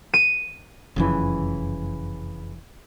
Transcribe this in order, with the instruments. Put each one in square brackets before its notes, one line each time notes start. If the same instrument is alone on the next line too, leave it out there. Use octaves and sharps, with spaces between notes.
[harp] D#7
[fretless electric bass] F1 F#2 F3 [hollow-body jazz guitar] C#3 E3